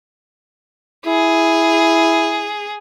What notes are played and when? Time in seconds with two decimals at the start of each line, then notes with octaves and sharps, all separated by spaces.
1.06 E4 G#4